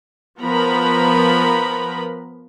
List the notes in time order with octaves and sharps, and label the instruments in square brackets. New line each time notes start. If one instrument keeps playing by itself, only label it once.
[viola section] F3 B3 A#4 B4 A#5 B5